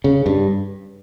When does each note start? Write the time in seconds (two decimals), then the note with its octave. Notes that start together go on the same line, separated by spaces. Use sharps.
0.04 C#3
0.26 G2